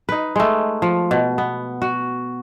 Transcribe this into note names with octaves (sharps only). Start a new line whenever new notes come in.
D#4 B4
G#3 A3
F3
B2
B3
F#4